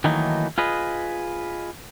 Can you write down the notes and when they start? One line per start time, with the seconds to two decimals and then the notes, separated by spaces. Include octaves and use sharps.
0.04 D#3 E3 F#3 A3 A#3 D#4
0.58 F4 G#4 B4 D#5